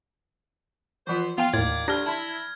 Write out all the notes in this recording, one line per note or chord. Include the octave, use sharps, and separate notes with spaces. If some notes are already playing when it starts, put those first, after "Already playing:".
E3 F3 B3 F4 C5
B3 F4 F5 G5
D#2 A2 D#3 F4 D5 G#6
D2 D4 G4 D5 F6 G#6 A#6
E4 A5 B5 C6